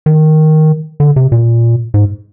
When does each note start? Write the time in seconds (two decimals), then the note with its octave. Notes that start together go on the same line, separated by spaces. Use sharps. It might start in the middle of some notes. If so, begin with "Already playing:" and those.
0.06 D#3
1.00 D3
1.16 C3
1.32 A#2
1.94 G#2